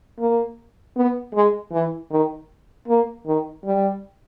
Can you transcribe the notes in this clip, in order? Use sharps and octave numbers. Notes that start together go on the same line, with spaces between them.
A#3
B3
G#3
E3
D#3
A#3
D#3
G3